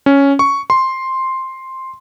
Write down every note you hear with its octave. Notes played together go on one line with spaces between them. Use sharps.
C#4
C#6
C6